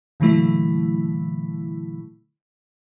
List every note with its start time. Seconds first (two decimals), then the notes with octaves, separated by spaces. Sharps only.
0.20 A#2 D3 E3 F#3 A3 E4